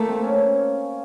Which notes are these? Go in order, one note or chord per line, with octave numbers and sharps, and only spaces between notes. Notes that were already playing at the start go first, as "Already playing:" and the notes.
Already playing: A3 A#3
C4
C#4